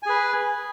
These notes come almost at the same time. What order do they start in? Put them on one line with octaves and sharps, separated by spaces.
G#5 G#4 B4